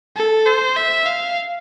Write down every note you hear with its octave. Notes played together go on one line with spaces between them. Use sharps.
A4
C5
E5
F5